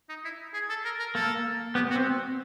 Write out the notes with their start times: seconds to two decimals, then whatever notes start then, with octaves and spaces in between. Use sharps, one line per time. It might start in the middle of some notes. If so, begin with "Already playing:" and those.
0.09 D#4
0.24 E4
0.54 G#4
0.69 A4
0.85 A#4
1.00 A#4
1.15 A#3 A4
1.75 B3 G4
1.91 F#4
1.96 C4